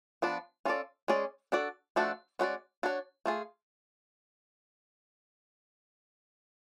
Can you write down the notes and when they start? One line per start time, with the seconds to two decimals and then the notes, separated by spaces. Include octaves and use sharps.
0.22 F3 B3 D4
0.65 C#4 F4 A4 D5
1.08 G#3 C#4 G#4 D5
1.52 D4 F#4 A4 D5
1.96 F3 A3 D4 F#4 A4
2.39 G#3 C#4 F#4 B4 D5
2.83 D4 F#4 C#5
3.26 A3 F4 G#4